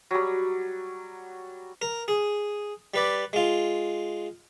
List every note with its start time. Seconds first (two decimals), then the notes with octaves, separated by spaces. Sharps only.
0.11 F#3 G3
1.82 A#4
2.08 G#4
2.94 G3 B4 D5
3.33 G#3 F4